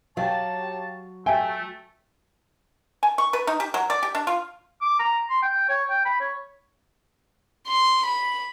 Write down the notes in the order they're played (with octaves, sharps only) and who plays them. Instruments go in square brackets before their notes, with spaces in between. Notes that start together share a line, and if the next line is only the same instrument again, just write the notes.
[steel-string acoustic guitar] F#3 [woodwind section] G4 C#5 A5 [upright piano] F5 G5
[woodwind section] A3 [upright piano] E5 G5 G#5
[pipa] G#5
C#6
B4
D#4
G4
F#3
D5
G4
D4
F4
[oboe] D6
A#5
C6
G5
C#5
G5
B5
C#5
[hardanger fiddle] C6
B5